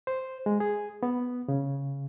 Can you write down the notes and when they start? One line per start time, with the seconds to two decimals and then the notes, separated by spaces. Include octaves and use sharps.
0.07 C5
0.46 G#3
0.60 G#4
1.03 B3
1.48 C#3